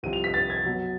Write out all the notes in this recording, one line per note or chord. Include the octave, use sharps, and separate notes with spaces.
C2 C3 F3 D#7
F7
B6
A6
G#6
B2 F#3 B3